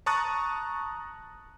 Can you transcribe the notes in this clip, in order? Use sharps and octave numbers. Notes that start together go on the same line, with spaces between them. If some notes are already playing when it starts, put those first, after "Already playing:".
A5 A#5 C#6 D#6 F#6 A6